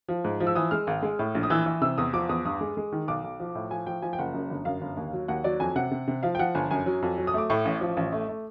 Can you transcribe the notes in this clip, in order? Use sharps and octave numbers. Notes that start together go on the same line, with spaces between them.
F3
G#2
F3
E6
E3 D#6
G#3 F6
G#1
G#3
A2
A#1
D#6
E3 E6
E3
C3 E6
E2 D#6
F3 D6
E2 D#6
G2 D#6
G#3
G#3
D#3
B1 D6
B1
F3
A2
F3 G#5
F3 G5
F3 G#5
G5
F#1 F#5
F#2
G1
F#2 F5
G1
D#2
F#3
D#2 F#5
F#3 D5
F2 G#5
C3 F#5
C3
C3
F3 F5
G5
F3 F#5
G1 G#5
F#2 G#5
F#3
F2
F#3
D#6
A3 D6
A2 C#6
A1
F3
A1
A3
A3